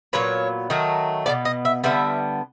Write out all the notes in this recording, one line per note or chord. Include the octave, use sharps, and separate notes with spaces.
A#2 F#3 B3 C#5
D#3 F#3 A3
B2 G#3 B3 D5
D#5
E5
D3 G3 B3 E5